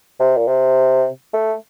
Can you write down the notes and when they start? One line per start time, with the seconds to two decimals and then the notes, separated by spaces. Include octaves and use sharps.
0.20 C3
0.37 A#2
0.48 C3
1.34 A3